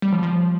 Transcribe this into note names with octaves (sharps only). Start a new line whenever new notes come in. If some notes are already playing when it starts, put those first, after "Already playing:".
G3
F3
F3